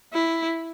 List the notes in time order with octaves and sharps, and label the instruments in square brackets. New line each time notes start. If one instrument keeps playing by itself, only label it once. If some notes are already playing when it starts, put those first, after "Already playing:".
[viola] E4